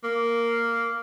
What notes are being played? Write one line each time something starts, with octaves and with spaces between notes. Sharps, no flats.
A#3